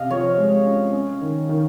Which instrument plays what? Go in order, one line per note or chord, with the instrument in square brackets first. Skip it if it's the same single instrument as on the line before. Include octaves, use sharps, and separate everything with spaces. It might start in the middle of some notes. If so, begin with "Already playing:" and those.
Already playing: [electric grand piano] C3 C#4 [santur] D#5 F5
[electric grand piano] F3 [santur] C#5
[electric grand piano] G#3
C#4
C#4
D#3
D#3